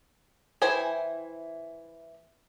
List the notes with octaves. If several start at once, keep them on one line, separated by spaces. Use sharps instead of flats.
E3 E4 C5 G5 G#5